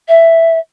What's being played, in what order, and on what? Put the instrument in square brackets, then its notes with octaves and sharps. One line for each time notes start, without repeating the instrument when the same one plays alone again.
[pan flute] E5